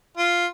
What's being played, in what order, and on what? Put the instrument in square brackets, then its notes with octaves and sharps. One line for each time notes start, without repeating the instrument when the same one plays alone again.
[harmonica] F4